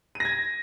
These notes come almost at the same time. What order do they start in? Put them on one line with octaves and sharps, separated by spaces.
D#7 A#6 G#6